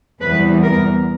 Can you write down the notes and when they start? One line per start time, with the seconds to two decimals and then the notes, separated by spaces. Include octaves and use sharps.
0.21 E2 C3 E3 G3 B3 B4
0.63 A#4